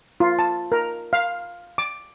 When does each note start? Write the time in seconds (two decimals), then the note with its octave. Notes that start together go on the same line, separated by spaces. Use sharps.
0.20 F4
0.39 A5
0.72 A#4
1.13 F5
1.78 D6